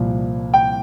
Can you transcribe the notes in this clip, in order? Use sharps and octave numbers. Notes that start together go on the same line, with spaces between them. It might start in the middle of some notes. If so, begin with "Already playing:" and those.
Already playing: C2 A#2 F3
G5